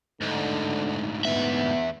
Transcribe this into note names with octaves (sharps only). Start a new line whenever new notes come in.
D2 G#2 D3
E2 B3 E5